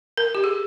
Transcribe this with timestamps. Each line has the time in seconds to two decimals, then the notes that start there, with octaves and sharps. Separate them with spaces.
0.17 A#4
0.35 G4
0.44 G#4